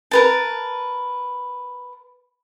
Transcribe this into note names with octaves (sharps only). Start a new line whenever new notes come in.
A#4 B4 A5